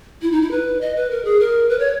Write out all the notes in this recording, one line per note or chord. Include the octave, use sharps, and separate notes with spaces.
E4
D#4
E4
B4
D#5
B4
A#4
G#4
A#4
B4
C#5